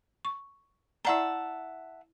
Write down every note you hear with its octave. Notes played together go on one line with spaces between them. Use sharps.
C#6
E4 D5 E5 F#5 A5 A#5